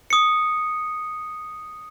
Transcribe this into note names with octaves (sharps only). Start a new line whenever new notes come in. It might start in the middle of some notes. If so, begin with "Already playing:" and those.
D#6 C#7